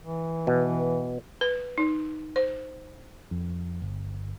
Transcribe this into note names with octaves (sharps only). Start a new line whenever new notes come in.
E3
B2
B4
D#4
C5
F2
G1